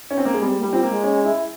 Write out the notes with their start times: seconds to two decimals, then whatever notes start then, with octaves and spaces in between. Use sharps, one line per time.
0.11 C#4
0.18 C4
0.25 A#3
0.34 G#3
0.42 G3 C4
0.57 A#3
0.63 G3
0.73 C4 F4
0.83 A#3
0.88 G#3
1.03 C#4
1.25 E4